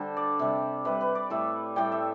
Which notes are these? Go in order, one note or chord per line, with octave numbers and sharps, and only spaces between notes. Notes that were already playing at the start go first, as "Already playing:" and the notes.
Already playing: D3 G3 C5
D5
C3 G3
C3 G3 B4
B4
D5
A2 G3 E5
A2 G3 G5
E5